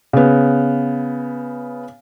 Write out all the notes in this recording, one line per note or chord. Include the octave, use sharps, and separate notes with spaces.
C#3 B3